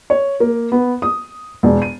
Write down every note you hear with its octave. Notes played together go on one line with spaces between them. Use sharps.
C#5
A#3
B3
D#6
E1
D#7